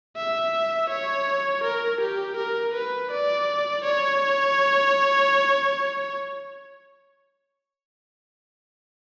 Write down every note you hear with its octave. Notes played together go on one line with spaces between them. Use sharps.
E5
C#5
A#4
G4
A#4
B4
D5
C#5